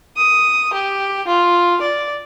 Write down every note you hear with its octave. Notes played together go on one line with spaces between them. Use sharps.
D#6
G4
F4
D5